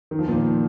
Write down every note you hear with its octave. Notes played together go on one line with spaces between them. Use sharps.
D#3
F3
A#2 D#3